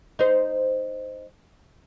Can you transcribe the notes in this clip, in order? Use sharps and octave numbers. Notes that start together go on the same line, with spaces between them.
D#4 C5